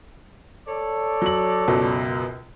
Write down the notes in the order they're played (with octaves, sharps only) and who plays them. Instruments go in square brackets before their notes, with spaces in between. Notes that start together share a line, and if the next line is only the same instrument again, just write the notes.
[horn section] A4 C#5 D5
[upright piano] F#3 F#7
C#2 F#2 B2